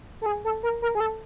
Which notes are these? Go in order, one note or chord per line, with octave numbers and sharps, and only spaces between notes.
A4
G#4
A4
A#4
A#4
G#4
A4